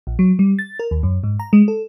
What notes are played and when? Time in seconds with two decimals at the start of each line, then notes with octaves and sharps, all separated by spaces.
0.07 A#1
0.19 F#3
0.39 G3
0.59 A6
0.79 A#4
0.91 D#2
1.03 F#2
1.23 G#2
1.40 A#5
1.53 G#3
1.68 A4